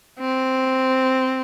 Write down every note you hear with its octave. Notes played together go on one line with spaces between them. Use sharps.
C4